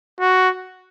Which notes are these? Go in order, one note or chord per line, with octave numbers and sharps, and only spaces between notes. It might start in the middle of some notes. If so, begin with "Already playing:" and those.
F#4